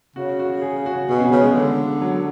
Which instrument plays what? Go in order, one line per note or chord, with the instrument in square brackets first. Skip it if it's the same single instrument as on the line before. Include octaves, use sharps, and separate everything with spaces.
[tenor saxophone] C#3 [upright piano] F#4
[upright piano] F#4
G#4
F#4
[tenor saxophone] B2 [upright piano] G#4
[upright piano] C#4
[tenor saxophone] C#3 [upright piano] B3
[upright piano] G#3
[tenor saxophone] D3
[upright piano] F#3